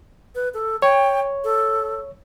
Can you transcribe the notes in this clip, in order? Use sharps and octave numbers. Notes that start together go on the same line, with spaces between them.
B4
A4
C#5 G5
A4